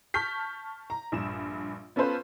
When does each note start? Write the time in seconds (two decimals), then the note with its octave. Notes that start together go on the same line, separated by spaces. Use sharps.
0.14 A5 C#6 F6 G6 B6
0.90 A#5
1.12 A#1 G2 E7
1.96 B3 C#4 F4 A4 B4 C5